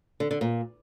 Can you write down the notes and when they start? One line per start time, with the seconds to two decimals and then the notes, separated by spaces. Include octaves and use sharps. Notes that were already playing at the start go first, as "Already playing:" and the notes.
0.20 D3
0.31 D3
0.41 A#2